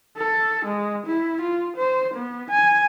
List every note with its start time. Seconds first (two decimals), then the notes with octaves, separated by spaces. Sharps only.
0.17 A4
0.65 G#3
1.07 E4
1.41 F4
1.77 C5
2.14 B3
2.50 G#5